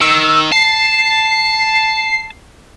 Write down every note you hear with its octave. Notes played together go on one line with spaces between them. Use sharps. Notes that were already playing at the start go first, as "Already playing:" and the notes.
D#3 E6
A5 C7